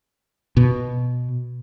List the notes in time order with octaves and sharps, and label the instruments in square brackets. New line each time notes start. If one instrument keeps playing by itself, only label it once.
[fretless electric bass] B2